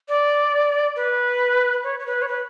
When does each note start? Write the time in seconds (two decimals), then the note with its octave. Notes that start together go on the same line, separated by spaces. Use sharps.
0.08 D5
0.96 B4
1.84 C#5
1.99 C#5
2.06 B4
2.22 C#5
2.28 B4